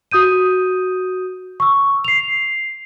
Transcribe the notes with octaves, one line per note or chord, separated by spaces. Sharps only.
F#4 D#6 G6 D#7
C#6 E6
C7 F7